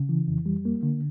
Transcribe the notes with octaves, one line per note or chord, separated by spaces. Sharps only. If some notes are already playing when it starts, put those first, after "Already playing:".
Already playing: C#3
E3
F2
G3
A#3
D3